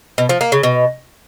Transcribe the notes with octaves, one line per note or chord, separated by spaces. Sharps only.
B2
F3
A#3
C#3
B2